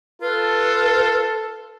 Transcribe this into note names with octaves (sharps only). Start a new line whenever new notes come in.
F4 A4 B4